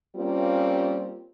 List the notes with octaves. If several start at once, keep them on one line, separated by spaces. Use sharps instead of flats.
G3 A#3 C4 C#4 F4